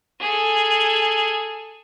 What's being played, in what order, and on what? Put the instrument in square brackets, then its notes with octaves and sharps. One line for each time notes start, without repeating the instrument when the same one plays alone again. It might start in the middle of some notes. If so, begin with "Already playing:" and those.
[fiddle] G#4 A4